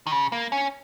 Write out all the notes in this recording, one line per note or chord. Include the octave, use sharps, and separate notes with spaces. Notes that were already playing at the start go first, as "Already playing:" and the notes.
D#3
C#3
A#3
C#4